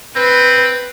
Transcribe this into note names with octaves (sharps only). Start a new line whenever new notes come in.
C4 B4